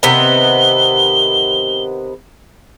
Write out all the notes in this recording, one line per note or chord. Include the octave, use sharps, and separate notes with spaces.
C3 D#3 B3 G7